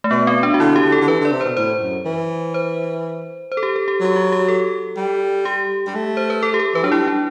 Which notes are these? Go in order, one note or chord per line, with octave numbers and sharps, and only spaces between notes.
A3
B2 B3
C4
D4
F#4
D3 E4
G4
D3
A4
D3
E3 B4
D3
D5
C3
B2 C5
A2 C5
F#2
E3
C5
C5
A4
G4
A4
G4
F#3 G4
F#4
G4
A4
G3
G4
G3
A3
C5
B4
A4
G4
A4
E3 B4
F#3 D4
G3 E4
D4